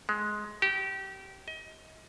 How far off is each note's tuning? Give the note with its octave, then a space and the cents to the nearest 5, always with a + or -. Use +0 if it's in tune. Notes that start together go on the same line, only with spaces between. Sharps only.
G#3 +15
G4 -25
D#5 +30